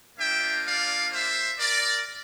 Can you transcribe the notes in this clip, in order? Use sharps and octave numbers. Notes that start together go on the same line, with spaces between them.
A#3 D4 F4 E5 G5
D5 F5
C5 E5
A#4 D5